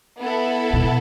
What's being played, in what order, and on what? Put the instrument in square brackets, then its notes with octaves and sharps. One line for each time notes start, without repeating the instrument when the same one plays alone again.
[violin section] B3 E4 A4
[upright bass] B2